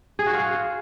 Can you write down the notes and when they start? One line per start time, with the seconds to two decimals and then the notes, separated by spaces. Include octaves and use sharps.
0.19 G#4
0.26 F#4
0.34 F4